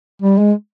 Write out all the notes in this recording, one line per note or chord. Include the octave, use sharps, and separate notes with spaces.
G3
G#3